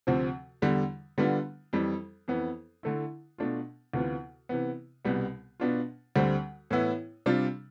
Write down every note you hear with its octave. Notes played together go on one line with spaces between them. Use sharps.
D2 C3 F3 C4
E2 D3 G3
D3 G3 B3 D4 F4
F2 E3 G3
F2 E3 B3
D3 A3 E4
B2 A3 D4 F4
D2 C3 E3 B3 F4
C3 E3 B3
C2 B2 G3 B3
B2 B3 D4 F4
D2 D3 G3 C4
A2 E3 B3 E4
C3 G3 D4 F4